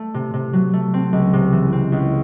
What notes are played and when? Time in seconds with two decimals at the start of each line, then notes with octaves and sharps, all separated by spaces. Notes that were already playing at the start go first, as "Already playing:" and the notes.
Already playing: A3
0.14 C3
0.34 C3
0.53 F#3
0.73 A3
0.94 C4
1.13 C#2
1.33 C3
1.53 E3
1.73 C4
1.92 C#2